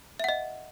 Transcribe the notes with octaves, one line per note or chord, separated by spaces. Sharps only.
D#5 E5 F#5